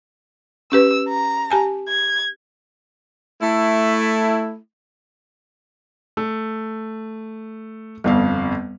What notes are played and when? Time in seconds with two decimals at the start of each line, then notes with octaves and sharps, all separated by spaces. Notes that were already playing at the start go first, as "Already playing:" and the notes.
0.72 C#4 G4 B4 E6
1.09 A#5
1.51 G4 G#5 A5
1.88 G#6
3.42 A3 E4
6.17 A3
8.04 G1 F2 G3 B3 C4 F5